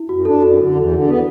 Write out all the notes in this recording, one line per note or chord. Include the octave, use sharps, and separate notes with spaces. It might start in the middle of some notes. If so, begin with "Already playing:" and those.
Already playing: E4
F#2 F#4
D4 A4
F#2 F#4
D3
E2
D3
B3